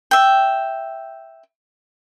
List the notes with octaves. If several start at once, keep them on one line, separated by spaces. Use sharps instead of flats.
E5 G5